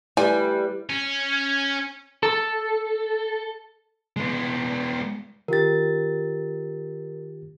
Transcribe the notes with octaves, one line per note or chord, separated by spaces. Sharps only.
G3 A3 E4 B4 G#5
C#4
A4
G#3 B3
D#3 F4 G4 A#4 A6